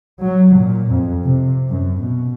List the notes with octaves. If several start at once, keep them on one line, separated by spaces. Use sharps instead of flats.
F#3
A#2
F2
C3
F#2
B2